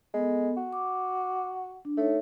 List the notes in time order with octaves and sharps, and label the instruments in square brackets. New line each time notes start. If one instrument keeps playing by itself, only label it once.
[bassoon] G#3 [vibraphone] B3 A4
[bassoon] F#4
[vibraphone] D6
D4
[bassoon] A3 [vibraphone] D#4 A4 C#5